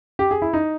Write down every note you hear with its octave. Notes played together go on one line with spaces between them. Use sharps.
G4
G#4
E4
D#4